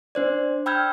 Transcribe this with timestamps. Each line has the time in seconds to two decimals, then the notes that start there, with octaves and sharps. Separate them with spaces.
0.15 D4 C5 D5
0.66 G5 B5 E6 F6 G6 G#6